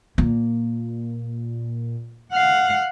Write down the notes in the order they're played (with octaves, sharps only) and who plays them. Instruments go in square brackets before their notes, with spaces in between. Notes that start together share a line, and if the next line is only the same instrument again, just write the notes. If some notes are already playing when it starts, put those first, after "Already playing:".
[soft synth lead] A#2 [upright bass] A#3
[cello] F5 F#5